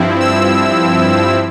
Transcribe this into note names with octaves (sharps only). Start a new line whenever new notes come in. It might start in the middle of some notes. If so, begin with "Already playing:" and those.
Already playing: G2 F3 C4 E4
E6